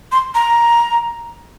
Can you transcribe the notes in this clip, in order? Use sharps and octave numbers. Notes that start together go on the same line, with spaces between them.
C6
A#5